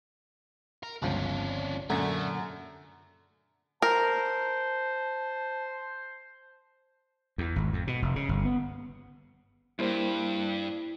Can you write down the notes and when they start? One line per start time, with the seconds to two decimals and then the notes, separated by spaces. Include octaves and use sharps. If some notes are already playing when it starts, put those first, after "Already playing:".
0.83 A#4
1.02 G1 C#2 F3 C#4 D4
1.90 F#2 A#2 D3 A3
3.82 A#4 C5 A5
7.38 E2
7.56 G#1
7.73 F2
7.87 B2
8.02 F1
8.16 C#3
8.29 G1
8.45 B3
9.79 E2 G2 G3 A#3 E4 C5